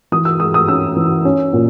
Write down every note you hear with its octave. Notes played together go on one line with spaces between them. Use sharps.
E3 D#6
E6
G#3 D#6
D#6
C#4 E6
E3
C#4
A#2